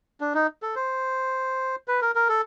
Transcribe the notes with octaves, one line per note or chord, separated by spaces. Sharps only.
D4
D#4
A4
C5
B4
A#4
A#4
A4